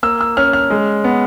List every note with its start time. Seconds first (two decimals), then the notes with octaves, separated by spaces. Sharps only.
0.03 A#3 E6
0.21 E6
0.37 C#4 F6
0.53 F6
0.70 G#3
1.04 B3